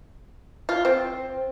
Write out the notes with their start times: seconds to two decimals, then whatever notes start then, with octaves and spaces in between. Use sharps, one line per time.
0.69 F4
0.85 C4